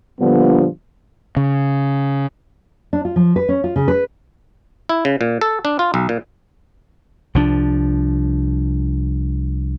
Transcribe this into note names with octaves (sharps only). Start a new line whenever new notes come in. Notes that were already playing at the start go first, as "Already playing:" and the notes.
A#2 D3 F3 G3 B3 D4
C#3
D4
F4
F3
B4
C#4
F4
C#3
B4
E4
C#3
A#2
A4
D4
F4
B1
A#2
C2 F3 D4